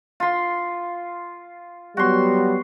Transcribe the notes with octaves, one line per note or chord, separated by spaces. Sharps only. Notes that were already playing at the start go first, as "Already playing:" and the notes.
F4 C6
F#3 G3 B3 F#4 C6